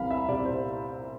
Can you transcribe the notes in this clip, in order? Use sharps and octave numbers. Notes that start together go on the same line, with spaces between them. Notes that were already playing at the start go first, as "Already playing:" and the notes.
Already playing: C2 E3 F5 B5
E5
C3 D5
C5